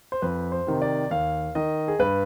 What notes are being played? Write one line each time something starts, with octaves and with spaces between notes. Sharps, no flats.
C5
F2 B4
C5
C3 D#3
D5
D#2 F5
D#3 D#5
G#4
G2 B4